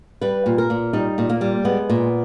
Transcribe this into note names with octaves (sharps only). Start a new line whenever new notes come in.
G3 B4
A#2
A#4
A#2
G3 D#4
A#2
A#3
G3
G#3 B3
A#2